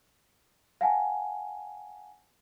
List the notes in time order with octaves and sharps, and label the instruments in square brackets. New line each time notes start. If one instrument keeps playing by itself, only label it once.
[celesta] F5 F#5 G#5 A5